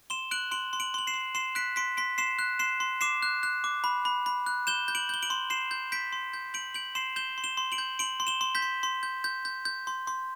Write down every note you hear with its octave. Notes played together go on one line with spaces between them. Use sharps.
C6 E7 G7
F#6 D7 F#7
C6 D7 F#7
C6
D7 F#7
C6 F#7
C7 E7
C6
C6 C7 E7
F#6 B6 D7
C6 B6 D7
C6 B6 D7
C6 C7 E7
F#6
C6 C7 E7
C6
D6 C7 E7
F#6
F#6
D6
B5
B5
B5
F#6
G6 E7 G7
G6
D7 F#7
G6 G7
D7 F#7
C6
C6 C7 E7
G6
G6 B6 D7
C6
G6
G6 D7 F#7
G6 D7 F#7
C6 C7 E7
G6 E7 G7
C6
E7 G7
C6
D7 F#7
G6
C6 D7 F#7
C6
E7 G7
C6
G6 B6
C6
C6
G6
G6
G6
G6
C6
C6